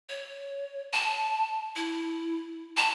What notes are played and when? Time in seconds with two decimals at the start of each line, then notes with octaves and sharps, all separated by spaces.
0.09 C#5
0.93 A5
1.76 E4
2.77 A5